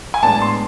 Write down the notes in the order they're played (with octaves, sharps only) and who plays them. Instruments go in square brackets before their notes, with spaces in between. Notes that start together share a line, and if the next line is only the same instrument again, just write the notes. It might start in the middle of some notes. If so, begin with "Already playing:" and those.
[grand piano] G#5
A2 G#3 B3 D4 A5
C6